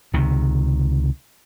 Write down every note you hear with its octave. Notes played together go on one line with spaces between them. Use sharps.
C#2 C3 D#3